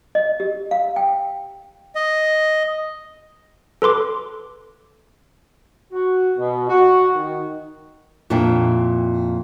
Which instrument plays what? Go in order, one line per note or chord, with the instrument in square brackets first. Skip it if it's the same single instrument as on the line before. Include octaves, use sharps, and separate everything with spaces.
[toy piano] D#5
G4
F5
G5
[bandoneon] D#5
[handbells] A4 B4 C6 D6
[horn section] F#4
B2
F#4
D#3
[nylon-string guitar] F2 A#2 D4 E4 A4 G5